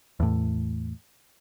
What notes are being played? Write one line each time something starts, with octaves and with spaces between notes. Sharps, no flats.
E2 A2